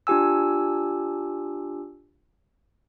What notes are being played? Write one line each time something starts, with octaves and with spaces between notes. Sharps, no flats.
D4 F4 G4 G#5 E6